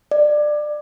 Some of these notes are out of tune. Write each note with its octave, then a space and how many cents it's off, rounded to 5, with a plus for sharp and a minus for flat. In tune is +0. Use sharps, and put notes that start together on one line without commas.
D5 +20